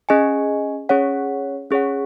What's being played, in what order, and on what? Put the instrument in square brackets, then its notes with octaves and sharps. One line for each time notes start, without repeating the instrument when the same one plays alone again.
[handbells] C#4 G#4 D#5 G#5
C#4 G#4 C#5 F#5
C#4 G#4 C#5 F#5